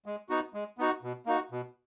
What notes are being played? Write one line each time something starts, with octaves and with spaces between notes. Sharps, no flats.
G#3
B3 D#4 F#4
G#3
B3 D#4 F#4
B2
A#3 D#4 F#4
B2